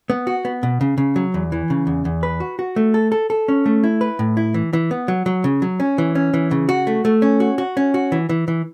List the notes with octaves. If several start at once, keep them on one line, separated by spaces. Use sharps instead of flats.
B3
F#4
B3
B2
C#3
C#3
F#3
E2
E3
C#3
E2
E2
B4
F#4
F#4
A3
A4
A4
A4
C#4
A3
E4
B4
A2
E4
E3
E3
B3
F#3
F#3
C#3
F#3
C#4
E3
C#4
E3
C#3
F#4
A3
A3
C#4
F#4
F#4
C#4
F#4
E3
E3
E3